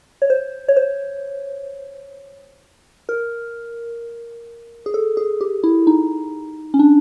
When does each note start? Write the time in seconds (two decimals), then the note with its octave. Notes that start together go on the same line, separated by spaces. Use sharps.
0.22 C#5
0.30 C5
0.68 C#5
0.76 C5
3.09 A#4
4.86 G#4
4.94 A4
5.17 G#4
5.41 G4
5.64 E4
5.87 D#4
6.74 C#4
6.79 D4